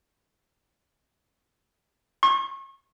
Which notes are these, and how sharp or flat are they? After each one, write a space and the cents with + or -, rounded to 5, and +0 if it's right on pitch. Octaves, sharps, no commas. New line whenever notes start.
C#6 -35